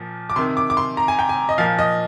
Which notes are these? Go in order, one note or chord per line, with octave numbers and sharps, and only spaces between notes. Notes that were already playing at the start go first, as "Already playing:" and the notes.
Already playing: A#2 F3
D6
C3 D#3 C6
D6
D6
C6
A#5
G#5
G5
G#5
D#5
A#2 F3 F5
D#5